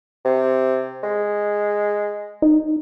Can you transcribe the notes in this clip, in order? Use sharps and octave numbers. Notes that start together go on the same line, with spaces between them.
C3
G#3
D#4